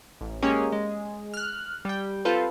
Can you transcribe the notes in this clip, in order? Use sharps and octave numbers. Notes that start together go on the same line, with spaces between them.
A1
G#3 A#3 C#4 G4 G#4 C#5
G#3
F6 F#6
G3 G5
C4 F4 A4 B4 C5